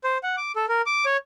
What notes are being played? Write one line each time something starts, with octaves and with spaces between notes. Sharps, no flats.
C5
F#5
D6
A4
A#4
D6
C#5